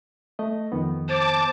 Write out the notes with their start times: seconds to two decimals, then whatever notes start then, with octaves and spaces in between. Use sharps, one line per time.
0.39 A3 D#5
0.72 F2 D#3 B3
1.09 C5 A5 D6